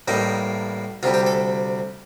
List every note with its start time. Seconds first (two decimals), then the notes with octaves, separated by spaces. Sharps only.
0.08 A1 A2 G3 A#3 D#4
1.03 D2 C3 G3 F4
1.14 G4
1.26 A4